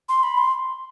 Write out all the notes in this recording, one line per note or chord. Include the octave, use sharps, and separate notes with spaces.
C6
B5
C6